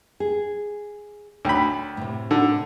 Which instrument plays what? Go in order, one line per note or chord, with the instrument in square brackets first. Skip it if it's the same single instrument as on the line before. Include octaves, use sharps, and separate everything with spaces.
[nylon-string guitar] G#4
[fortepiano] D2 B5 [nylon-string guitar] C#5 G5
[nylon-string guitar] A2 C3
[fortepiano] D3